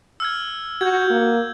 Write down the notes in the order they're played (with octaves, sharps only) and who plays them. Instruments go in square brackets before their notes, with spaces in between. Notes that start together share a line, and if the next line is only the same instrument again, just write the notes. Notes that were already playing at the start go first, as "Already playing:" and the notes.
[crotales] E6 F6 G#6
[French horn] F#4 [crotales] G6 G#6
[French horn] A#3